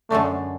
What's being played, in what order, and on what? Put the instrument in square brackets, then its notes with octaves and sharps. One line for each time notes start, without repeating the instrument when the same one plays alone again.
[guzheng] F#2 D3 G#3 D4 [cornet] A3